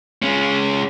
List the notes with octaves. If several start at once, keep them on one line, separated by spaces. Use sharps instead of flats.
G#3 C#4